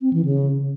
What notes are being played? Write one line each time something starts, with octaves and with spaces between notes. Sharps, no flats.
C4
E3
C#3